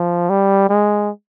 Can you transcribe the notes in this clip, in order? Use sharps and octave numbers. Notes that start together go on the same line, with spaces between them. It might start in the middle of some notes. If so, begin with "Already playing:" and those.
Already playing: F3
G3
G#3